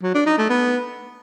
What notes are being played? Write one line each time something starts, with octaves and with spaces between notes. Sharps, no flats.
F#3
D4
D#4
A3
B3